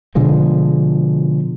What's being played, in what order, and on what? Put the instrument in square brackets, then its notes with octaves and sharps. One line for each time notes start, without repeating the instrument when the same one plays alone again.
[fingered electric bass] B2 D3 F3 G#3